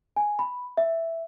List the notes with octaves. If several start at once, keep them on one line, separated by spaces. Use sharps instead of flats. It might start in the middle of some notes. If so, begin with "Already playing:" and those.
G#5
B5
E5